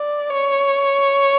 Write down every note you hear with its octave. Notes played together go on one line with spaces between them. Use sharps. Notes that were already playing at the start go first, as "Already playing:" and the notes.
Already playing: D5
C#5